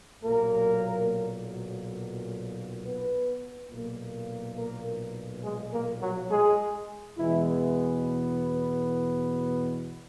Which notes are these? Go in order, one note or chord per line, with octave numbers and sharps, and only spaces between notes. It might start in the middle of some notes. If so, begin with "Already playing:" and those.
B1 A#2 F#3 A#3 A#4
B3 B4
B1 A#2 A#3
A#3 A#4
G#3 G#4
A#3 A#4
F#3 F#4
G#3 G#4
E2 B2 E3 G#3 B3 E4